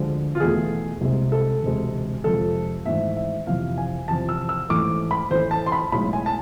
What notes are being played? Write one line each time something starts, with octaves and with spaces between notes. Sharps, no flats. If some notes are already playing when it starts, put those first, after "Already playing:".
Already playing: D2 D3 F3 G#3
F4
E2 B2 A3 G#4
C2 C3 G#3
A4
E1 D2 C3 G#3
F2 C3 F3 G#3 A4
G#1 G#2 E3 A3 E5
E5
F2 C3 E3 F5
G#5
E2 C3 F3 A5
E6
E6
A1 G#2 E3 A3 D6
B5
A1 A2 E3 A3 C5
A5
C6
B5
B1 A2 G#3 B5
G#5
A5